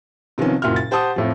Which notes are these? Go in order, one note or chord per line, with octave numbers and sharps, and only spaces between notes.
C3 D#3 F3 B3 C#4
F#1 A#2 E4 F#4 F6
A6
G4 C5 F#5 A5 D#6
F2 A2 F3